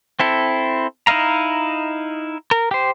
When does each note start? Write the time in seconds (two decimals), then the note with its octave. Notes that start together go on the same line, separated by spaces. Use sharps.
0.20 C4 E4 A4
1.07 D#4 E4 D#5 F5 A#5
2.51 A#4
2.71 G4 C5